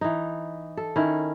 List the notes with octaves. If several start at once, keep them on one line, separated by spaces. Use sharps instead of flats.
E3 D#4
A4
D#3 C#4 E4